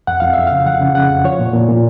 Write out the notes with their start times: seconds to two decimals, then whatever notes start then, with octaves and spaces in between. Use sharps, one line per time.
0.07 F2 F#5
0.20 F2 F5
0.34 F2 E5
0.47 C#3 F5
0.66 F3 F#5
0.81 C#3
0.95 C#3 F#5
1.10 F2
1.25 F3 C#5
1.40 A#2
1.54 A#2
1.68 A#2